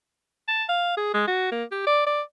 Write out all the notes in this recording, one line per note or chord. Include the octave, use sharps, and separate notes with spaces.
A5
F5
G#4
G#3
F#4
A#3
G4
D5
D5